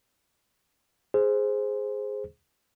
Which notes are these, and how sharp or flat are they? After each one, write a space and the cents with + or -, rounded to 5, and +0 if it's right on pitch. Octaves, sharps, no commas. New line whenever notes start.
G#4 +0 C5 +0